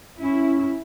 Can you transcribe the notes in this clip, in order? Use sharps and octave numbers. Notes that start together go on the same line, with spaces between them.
C#4 E4